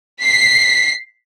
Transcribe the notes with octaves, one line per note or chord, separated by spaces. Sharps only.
B6 C7